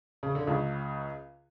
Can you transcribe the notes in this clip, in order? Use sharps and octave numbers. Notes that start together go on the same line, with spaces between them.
C#3
D3
C#2 C#3